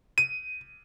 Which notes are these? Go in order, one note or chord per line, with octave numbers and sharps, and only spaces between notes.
D#7